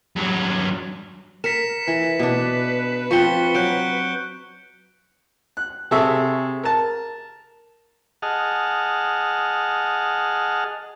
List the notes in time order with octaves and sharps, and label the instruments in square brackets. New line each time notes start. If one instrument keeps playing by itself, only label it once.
[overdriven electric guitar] G2 F#3
[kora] A#4 [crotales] B6 C#7 E7
[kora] E3 [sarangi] B4
[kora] B2 D4
[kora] F3 C4 [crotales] C#6 C#7 G7
[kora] F#3 [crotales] F#6 G6 D7
[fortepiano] F#6
C3 G#4 A4 E5 C#6
A#4 A5
[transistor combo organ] G#4 D#5 F#5 A5 F6